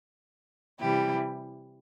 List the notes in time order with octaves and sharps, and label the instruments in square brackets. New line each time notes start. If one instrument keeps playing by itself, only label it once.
[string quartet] C3 E3 G3 E4 G4